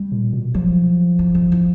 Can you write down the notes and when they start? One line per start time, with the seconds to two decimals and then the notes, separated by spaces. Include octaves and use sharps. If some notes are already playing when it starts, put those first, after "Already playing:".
Already playing: G3
0.12 A#2
0.33 B2
0.54 F3 F#3
1.19 E3
1.35 D#3
1.52 E3